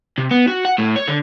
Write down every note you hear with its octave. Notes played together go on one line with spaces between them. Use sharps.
C3
B3
F#4
F#5
A2
C#5
D3